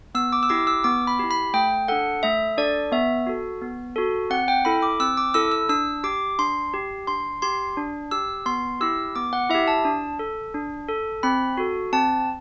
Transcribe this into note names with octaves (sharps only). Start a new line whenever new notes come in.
B3 E6
D6
E6
E4 G4 D6
E6
B3 D6
B5
E4 G4
B5
A3 G5
D4 A4 F#5
A3 E5
D4 A4 D5
B3 E5
F#4 A4
B3
F#4 A4
C4 F#5
G5
E4 A4 B5
D6
C4 E6
D6
E4 A4 E6
E6
D4 E6
G4 D6
D4 C6
G4
D4 C6
G4 C6
D4
G4 E6
B3 C6
E4 G4 E6
B3 D6
F#5
E4 E5
G4
A5
D4
A4
D4
A4
C4 B5
F#4 A4
C4 A5